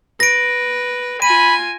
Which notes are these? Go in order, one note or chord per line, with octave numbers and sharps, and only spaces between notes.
B4 A#6 D7
F4 G#5 B5 D#7